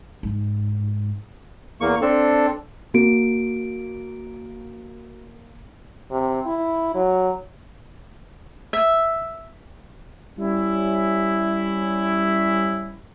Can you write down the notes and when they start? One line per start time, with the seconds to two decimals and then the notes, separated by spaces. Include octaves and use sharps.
0.23 G#2
1.81 E2 A#3 C#6
2.01 C4 D4 A4
2.94 A#3 F#4 D7
6.11 C3
6.46 E4
6.95 F#3
8.73 E5
10.38 G3 C#4 E4